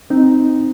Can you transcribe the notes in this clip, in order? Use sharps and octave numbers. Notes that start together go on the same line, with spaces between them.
C4 D#4